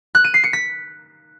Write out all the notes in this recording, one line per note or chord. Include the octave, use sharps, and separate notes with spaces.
F#6
D#7
C7
C#7
B6